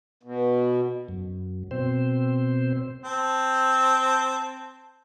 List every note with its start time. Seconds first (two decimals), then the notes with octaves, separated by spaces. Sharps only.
0.23 B2
1.09 F#2
1.71 B2 C4 C5
3.04 C4 A5